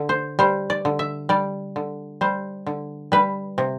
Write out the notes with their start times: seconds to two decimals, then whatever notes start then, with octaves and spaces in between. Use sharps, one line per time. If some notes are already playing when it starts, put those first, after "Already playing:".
Already playing: D3
0.09 C5
0.39 G3 C5
0.70 D5
0.85 D3
0.99 E5
1.29 G3 D5
1.76 D3
2.21 G3 C5
2.66 D3
3.12 G3 B4
3.58 C3